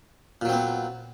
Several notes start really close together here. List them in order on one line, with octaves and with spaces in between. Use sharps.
A#2 F#3 C4 B3